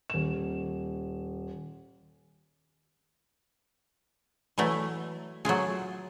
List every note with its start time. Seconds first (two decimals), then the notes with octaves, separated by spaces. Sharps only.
0.10 D#1 E7
4.58 E3 F#3 A3 E4
5.45 F#3 A3 F4 G#4